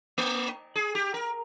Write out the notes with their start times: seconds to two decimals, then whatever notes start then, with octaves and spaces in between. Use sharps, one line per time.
0.18 A#3
0.75 G#4
0.95 G4
1.14 A#4